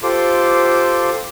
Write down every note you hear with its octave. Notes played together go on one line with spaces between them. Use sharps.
F4 G4 A4 C5 C6 D6